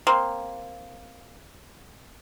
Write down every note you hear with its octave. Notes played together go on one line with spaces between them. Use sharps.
A#3 C4